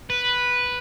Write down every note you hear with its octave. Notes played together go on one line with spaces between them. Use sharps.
B4